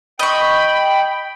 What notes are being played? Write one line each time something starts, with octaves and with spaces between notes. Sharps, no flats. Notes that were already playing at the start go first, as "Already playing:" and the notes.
D#5 G5 B5 C#6